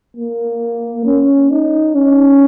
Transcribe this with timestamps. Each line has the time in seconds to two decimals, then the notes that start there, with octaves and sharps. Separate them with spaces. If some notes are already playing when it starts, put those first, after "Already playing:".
0.17 A#3
1.06 C#4
1.51 D#4
1.95 C#4